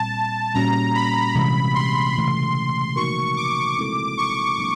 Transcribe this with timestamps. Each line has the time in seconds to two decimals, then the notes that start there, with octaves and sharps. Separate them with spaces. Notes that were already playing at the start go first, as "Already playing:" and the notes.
Already playing: A#2 G3 C4 A5
0.54 A#2 G3 A#3 C#4 F#4 A#5
0.95 B5
1.35 C3 E3 G#3 C#4
1.75 C6
2.16 C#3 E3 A3
2.96 F3 A#3 D#4 F#4 A#4 C#6
3.37 D6
3.78 G#3 C4 E4 A4
4.17 C#6
4.58 F#3 A#3 D4